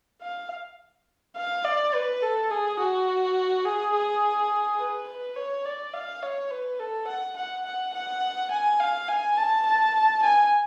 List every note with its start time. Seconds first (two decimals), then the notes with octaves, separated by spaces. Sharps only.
0.22 F5
1.36 F5
1.65 D5
1.94 B4
2.22 A4
2.51 G#4
2.79 F#4
3.65 G#4
3.94 G#4
4.79 B4
5.08 B4
5.36 C#5
5.65 D5
5.93 F5
6.22 C#5
6.50 B4
6.80 A4
7.07 F#5
7.36 F#5
7.65 F#5
7.94 F#5
8.50 G#5
8.80 F5
9.08 G#5
9.36 A5
9.65 A5
10.22 G#5